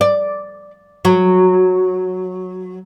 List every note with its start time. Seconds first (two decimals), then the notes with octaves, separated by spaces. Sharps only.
0.01 D5
1.05 F#3